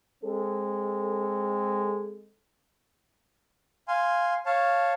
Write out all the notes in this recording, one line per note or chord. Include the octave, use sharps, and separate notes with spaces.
G#3 C4 A4
F5 G#5 C6
C#5 F5 A5